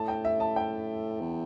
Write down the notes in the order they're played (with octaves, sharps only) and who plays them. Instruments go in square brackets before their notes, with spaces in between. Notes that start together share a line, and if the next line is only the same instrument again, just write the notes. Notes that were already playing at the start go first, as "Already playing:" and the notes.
Already playing: [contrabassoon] A2 [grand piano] A5
[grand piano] G5
E5
A5
G5
[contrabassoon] E2